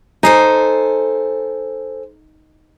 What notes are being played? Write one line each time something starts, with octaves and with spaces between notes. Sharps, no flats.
D#4 A4 C5 G#5